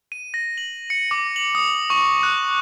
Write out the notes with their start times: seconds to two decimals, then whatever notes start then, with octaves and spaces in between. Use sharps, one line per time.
0.12 D#7
0.34 A#6
0.58 F#7
0.90 C#7
1.11 D6
1.36 F#7
1.55 D#6
1.90 C#6
2.23 F#6